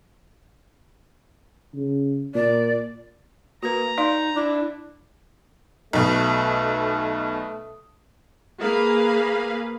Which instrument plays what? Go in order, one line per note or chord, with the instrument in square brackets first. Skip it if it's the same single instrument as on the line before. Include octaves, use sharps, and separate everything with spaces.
[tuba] C#3
[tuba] A#2 [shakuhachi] D5
[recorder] A#3 [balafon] F#4 B4 [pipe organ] A#5
[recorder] D#4 [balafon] D5 F5 C6
[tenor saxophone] D4 [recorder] E4
[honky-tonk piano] B1 B2 [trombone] A3
[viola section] A#3 G#4 B4 F5